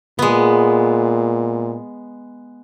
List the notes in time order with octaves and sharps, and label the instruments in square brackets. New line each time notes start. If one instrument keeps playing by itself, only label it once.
[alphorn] A#2 [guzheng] G#3 B3